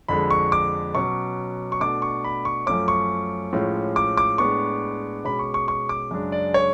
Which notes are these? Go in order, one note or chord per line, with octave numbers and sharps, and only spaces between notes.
F2 D3 G#3 B5
C#6
D6
B2 F#3 C#4 C#6
C#6
B2 A3 D4 D6
C#6
B5
C#6
F#2 F3 A3 C#4 D6
C#6
A2 F3 G#3 C#4
D6
D6
A2 G#3 B3 D4 C#6
B2 G#3 C#4 B5
C#6
C#6
C#6
D6
F#2 C#3 G#3 D4
D5
C#5